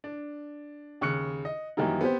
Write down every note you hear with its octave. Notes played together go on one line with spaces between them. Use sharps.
D4
D#2 C#3 C#6 F#6 C#7
D#5
F#2 D#3 E3 G3 A#3 D#4
B3 C4 G4 C5